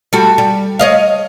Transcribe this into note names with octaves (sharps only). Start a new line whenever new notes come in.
G3 F#4 A4
G3
C#5 D#5 F5